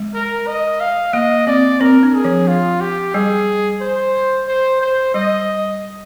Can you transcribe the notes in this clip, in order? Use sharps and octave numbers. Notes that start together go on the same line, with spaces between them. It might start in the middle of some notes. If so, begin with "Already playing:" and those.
Already playing: G#3
A#4
D#5
F5
A#3 D#5
C4 D5
C4 A#4
D4
G#4
F3
F4
G4
G3 G#4
C5
C5
C5
G3 D#5